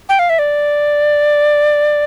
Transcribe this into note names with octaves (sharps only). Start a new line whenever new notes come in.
G5
F5
E5
D5